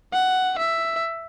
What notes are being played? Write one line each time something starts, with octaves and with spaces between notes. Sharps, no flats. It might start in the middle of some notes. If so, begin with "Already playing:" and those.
F#5
E5